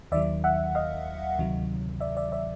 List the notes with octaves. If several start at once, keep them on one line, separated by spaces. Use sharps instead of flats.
D#2 D#3 F#3 D5 E5
E5 F#5
D#5 F5
D2 C3 D#3 F#3
D5 E5
D5 E5
D5 E5